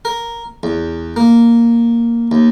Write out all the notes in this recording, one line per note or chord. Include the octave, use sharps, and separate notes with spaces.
A#4
E2
A#3
D#2